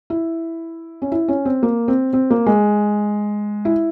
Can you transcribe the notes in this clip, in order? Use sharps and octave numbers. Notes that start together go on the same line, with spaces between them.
E4
C#4
E4
C#4
C4
A#3
C4
C4
A#3
G#3
E4